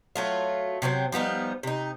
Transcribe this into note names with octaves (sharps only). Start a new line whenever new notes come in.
F#3 A3 F4
C3 F#3 B3 C4
F3 G3 B3 D#4
C3 D#4